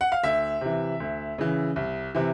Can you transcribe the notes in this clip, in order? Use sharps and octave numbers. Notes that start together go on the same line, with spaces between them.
F#5
F5
D2 E5
C3 E3
D2
C#3 E3
C2
C3 E3